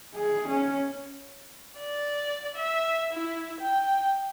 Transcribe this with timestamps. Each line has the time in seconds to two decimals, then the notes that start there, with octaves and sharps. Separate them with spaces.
0.14 G#4
0.48 C#4
1.79 D5
2.56 E5
3.13 E4
3.61 G5